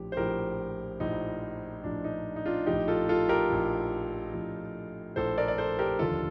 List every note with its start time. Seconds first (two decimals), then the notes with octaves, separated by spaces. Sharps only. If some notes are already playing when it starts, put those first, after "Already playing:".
Already playing: A#1 A2 F3 G4
0.12 C5
0.17 A#1 A2 F3 G4 A#4
1.00 A#1 A2 F3 D#4
1.84 A#1 A2 F3 D4
2.04 D#4
2.36 D#4
2.46 D4 F4
2.66 A#1 A2 F3 D#4 G4
2.88 F4 A4
3.09 F4 A4
3.29 G4 A#4
3.50 A#1 A2 F3
4.33 A#1 A2 F3
5.16 A#1 A2 F3 A4 C5
5.38 A#4 D5
5.48 D5
5.58 A4 C5
5.79 G4 A#4
5.99 F1 D#2 D3 F3 F4 A4